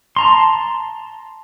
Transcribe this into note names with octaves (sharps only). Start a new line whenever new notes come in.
A5 A#5 C6